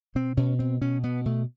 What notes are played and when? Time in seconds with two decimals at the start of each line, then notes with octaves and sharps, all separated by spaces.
0.15 B2 C4
0.37 B2 C#4
0.59 B2 C4
0.81 B2 C#4
1.03 B2 B3
1.26 B2 A3